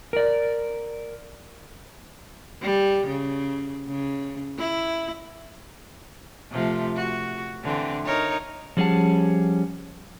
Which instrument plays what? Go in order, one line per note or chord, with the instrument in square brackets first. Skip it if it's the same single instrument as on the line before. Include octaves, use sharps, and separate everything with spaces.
[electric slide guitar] A#4 D5
[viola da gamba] G3
C#3
C#3
E4
C3 F3 A3
F#4
D3 E3 C4
D#4 A#4 C#5
[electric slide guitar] F3 G3 C#4 G#4 F#5 A5